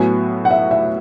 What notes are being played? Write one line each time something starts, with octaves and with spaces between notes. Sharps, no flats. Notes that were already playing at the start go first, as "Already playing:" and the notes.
Already playing: A2 F#3 B3 F#4 G#5
F#5
E5
E5